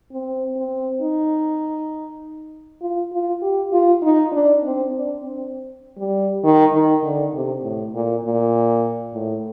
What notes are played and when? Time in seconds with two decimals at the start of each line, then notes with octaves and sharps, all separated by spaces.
0.12 C4
0.56 C4
1.02 D#4
2.82 F4
3.12 F4
3.42 G4
3.73 F4
4.02 D#4
4.32 D4
4.63 C4
4.93 D4
5.22 C4
5.98 G3
6.44 D#3
6.73 D#3
7.03 D3
7.34 C3
7.63 A2
7.94 A#2
8.24 A#2
9.14 A2